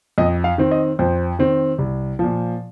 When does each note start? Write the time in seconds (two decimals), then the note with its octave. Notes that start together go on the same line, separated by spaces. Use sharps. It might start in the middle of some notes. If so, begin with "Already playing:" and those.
0.18 F2 D#5
0.44 F5
0.58 D#3 C4
0.71 D#5
0.99 F2 C5
1.39 D#3 C4
1.78 C2
2.19 A#2 F3